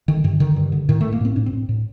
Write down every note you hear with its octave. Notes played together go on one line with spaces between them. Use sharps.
D3 D#3
G2 D#3
D3 D#3
G2
D3
A2 D#3
A2 A3
A#3
A2 C4
A2 D4
C4
A2
A2